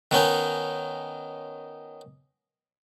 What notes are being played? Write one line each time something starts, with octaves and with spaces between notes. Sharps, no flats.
D#3 B3 C#4 D#4